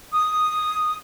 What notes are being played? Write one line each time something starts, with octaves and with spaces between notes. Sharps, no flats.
D#6